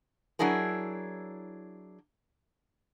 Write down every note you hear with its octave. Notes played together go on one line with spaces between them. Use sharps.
F#3 D4 E4 G#4 A#4